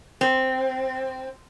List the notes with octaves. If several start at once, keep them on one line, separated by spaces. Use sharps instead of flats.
C4